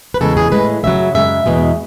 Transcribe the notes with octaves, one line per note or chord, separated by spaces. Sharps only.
B4
E2 C#3 G#3 A4
G#4
A2 G#3 B4
F#2 C#3 F#3 E5
F#2 C#3 G#3 E5
E2 B2 G#3